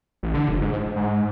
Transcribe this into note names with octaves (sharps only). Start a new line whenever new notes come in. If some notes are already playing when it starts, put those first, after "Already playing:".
A1
D3
F1
G#2
G#2